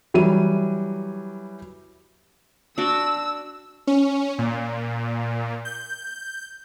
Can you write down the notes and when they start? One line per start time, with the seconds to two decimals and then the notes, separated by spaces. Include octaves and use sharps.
0.14 E3 F#3 G3 D#7
2.78 D4 F#4 D5 E6
3.87 C#4
4.38 A#2
5.65 G6